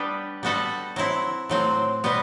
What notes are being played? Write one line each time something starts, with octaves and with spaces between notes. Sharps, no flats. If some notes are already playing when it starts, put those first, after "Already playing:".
Already playing: G3 B3 D4 G4
G3 B3 F#4 A4
F#3 C4 E4
A2 F#3 C4
B2 G3 B3